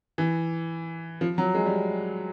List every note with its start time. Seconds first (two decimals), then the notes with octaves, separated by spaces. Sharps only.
0.18 E3
1.21 F3
1.38 F#3
1.55 G#3
1.66 G3